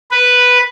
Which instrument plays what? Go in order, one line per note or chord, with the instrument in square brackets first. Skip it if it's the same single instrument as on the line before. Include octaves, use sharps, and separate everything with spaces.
[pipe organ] B4